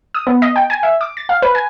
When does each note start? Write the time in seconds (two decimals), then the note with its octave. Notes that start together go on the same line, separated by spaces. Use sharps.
0.15 D#6
0.27 B3
0.42 D#5
0.56 G5
0.70 G#5
0.83 E5
1.01 D6
1.17 A6
1.29 F5
1.42 B4
1.55 G#5